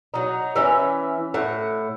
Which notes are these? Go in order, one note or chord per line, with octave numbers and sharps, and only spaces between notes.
F#3 D#4
E3 C#4 D5 E5
A2 F#5